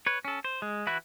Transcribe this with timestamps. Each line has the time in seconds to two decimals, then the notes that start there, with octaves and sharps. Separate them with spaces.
0.06 B4 C#5
0.25 C#4 A4
0.45 C5
0.62 G#3
0.87 E3 E4 F#4 B5 F#6